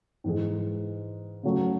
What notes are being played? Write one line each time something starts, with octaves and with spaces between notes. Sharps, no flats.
G#2 E3 G#3 D#4 G#4
C#3 F#3 A3